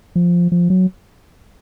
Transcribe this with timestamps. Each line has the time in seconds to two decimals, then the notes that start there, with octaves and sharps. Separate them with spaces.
0.16 F3
0.52 F3
0.70 F#3